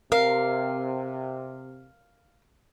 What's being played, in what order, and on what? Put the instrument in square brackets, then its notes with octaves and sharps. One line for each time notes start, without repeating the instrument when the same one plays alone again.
[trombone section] C3 [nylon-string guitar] A#4 [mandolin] F5